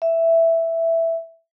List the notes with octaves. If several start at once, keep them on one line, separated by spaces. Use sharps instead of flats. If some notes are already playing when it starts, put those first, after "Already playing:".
E5